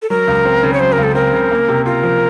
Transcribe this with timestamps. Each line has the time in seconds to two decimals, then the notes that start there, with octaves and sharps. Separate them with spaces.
0.02 A4
0.10 F#3 A#4
0.28 C#2
0.45 C4
0.63 C#3
0.73 C#5
0.80 F#3 C5
0.92 A#4
0.98 C#2
1.03 A4
1.15 C4 A#4
1.33 C#3
1.51 A#3
1.68 C3
1.86 F4 A#4
2.03 F3